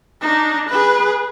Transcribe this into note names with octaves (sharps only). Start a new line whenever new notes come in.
D4 D#4
G#4 B4